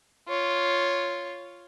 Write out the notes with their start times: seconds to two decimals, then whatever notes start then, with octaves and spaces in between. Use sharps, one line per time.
0.29 F4 C#5